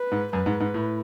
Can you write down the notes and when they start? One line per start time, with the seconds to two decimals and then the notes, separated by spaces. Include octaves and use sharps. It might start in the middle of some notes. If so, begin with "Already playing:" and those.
Already playing: B4
0.12 G#2
0.33 F#2 B4
0.46 G#2
0.60 G#2
0.74 A2